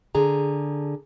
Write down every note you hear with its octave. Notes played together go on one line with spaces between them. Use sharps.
D3 G#4 A#5